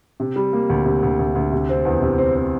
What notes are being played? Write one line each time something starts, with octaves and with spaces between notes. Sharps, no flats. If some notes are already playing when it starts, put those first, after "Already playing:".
C3
G3
A#3
D2
C3
D2
D2
D2
C3
C4
E2
C3
C4
C4